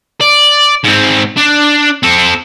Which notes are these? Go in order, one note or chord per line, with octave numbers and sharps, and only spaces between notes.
D5
G#2 C4
D4
C4 A4